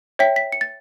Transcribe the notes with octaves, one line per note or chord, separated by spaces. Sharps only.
C#5 E5 G5 B6
B6
C#7
A6